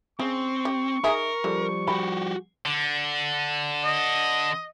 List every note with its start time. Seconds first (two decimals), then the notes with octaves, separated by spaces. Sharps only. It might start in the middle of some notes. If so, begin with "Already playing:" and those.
0.20 C#3 C4 C#6
0.65 G4
1.04 D#4 G#4 A#4 E5
1.44 D3 F3 G3
1.88 F#4 G4 B5
2.66 D3
3.85 D#5